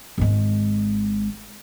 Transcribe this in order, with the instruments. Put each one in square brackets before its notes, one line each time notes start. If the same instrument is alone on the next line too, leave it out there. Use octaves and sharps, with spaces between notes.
[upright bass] G#1 G#3